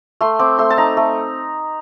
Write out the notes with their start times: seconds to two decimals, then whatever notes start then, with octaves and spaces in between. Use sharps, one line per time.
0.21 A3 C6
0.39 C4 D6
0.59 A3 C6
0.70 A5
0.78 D#4 A#5
0.97 A3